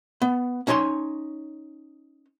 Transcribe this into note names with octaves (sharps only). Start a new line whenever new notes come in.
B3
C#4 D#4 C#5 A#5 C6